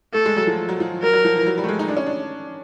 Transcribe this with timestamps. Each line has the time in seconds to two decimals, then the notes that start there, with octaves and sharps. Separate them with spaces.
0.14 A3 A4
0.26 G#3
0.37 F#3
0.47 F3
0.69 F#3
0.80 F3
1.02 F#3 A#4
1.13 F#3
1.25 F3
1.35 E3
1.47 F#3
1.58 G3
1.64 A3
1.68 G#3
1.79 D#4
1.88 D4
1.97 C#4
2.06 D4